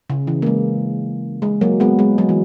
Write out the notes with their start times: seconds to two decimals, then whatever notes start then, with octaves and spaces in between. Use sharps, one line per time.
0.10 C#3
0.27 E3
0.42 A#3
0.46 G#3
1.42 G#3
1.61 F#3 A#3
1.80 G#3 B3
1.99 G#3
2.18 F#3
2.29 E3